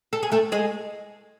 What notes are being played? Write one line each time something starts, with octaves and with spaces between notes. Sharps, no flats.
A4
G#4
A3 A4
G#3 G#4